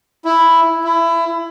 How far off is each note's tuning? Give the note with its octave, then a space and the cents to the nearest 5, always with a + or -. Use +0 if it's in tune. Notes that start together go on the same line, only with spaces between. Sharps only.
E4 +0
E4 +20